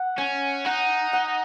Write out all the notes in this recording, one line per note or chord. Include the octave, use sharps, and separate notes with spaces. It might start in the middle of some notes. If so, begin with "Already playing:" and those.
Already playing: F#5
C#4 G#5
D#4 F#5
F#5